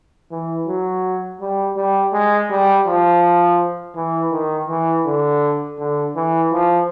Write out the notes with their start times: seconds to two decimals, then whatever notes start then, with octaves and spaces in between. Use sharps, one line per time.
0.31 E3
0.67 F#3
1.41 G3
1.76 G3
2.13 G#3
2.50 G3
2.87 F3
3.96 E3
4.32 D#3
4.69 E3
5.05 D3
5.79 D3
6.16 E3
6.52 F3